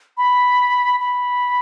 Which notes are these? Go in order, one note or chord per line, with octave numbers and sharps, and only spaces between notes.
B5
B5